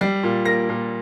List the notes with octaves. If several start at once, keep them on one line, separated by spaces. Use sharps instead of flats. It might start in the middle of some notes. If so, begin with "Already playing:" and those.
G3 C7
A#2
A#3 A#6
A#2